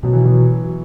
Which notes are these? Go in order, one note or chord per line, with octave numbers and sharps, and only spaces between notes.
B2 F#3
E3
F#3